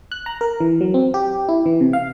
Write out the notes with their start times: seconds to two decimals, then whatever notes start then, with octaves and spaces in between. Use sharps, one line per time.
0.12 F#6
0.26 A#5
0.41 A#4
0.60 E3
0.81 F#3
0.94 C4
1.14 G4
1.49 E4
1.66 E3
1.81 C3
1.93 F5